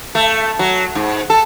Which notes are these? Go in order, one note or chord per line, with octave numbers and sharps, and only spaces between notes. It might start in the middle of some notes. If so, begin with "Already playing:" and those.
A3
F#3
G#2
A4